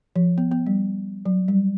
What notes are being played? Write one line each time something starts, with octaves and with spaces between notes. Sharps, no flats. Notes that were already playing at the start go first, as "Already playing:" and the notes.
F3
B3
B3
G3
F#3
G3